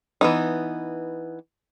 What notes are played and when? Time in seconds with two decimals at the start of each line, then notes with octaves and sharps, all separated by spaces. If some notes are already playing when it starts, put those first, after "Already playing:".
0.21 E3 B3 D#4